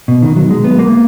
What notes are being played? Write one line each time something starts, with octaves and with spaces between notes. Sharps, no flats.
B2
D#3
F#3
G#3
B3
A#3